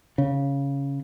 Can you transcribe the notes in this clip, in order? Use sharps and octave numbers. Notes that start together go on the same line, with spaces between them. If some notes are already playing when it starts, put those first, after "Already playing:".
C#3